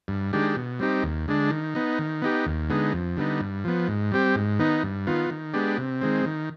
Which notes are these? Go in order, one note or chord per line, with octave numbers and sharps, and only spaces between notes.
G2
D#3 G#3 D4 G4
B2
G3 C4 D#4 G4
D#2
D3 G#3 D4
D#3
B3 D#4
D#3
B3 D#4 G4
D#2
D3 G#3 B3 D#4
F2
D3 G3 B3 D#4
G2
F3 B3
G#2
G3 C4 G4
G#2
D#3 B3 D#4
G2
D#3 B3 F4
D#3
G#3 B3 D4 G4
C3
D#3 G#3 C4
D#3